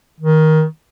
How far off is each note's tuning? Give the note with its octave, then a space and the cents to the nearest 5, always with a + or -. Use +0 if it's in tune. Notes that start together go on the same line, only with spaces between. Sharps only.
D#3 +15